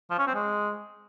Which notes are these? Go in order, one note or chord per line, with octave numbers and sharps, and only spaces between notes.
F3
C#4
C4
G#3